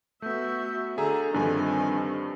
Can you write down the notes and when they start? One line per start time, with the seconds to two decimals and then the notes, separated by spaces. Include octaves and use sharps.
0.22 A3 B3 F#4 E5 G6
0.98 D3 G#4 E5 G#5 A#5
1.34 G2 D3 D#3 F3 C4 G#5